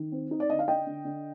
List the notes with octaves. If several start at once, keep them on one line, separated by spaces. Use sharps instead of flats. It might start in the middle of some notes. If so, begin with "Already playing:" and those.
Already playing: D#3
C4
D#4
D5
D3 D#5
F5
D4 D#5 G5
D3
D3